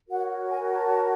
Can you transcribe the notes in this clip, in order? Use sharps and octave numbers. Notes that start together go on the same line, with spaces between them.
F#4 A#4 C#5 F#5
G#5
A5